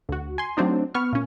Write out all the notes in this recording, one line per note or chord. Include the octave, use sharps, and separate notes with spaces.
D2 F#4
G#5 C6
F#3 A3 C4 D4 D#4
B3 C#6 F6
A#2 C#4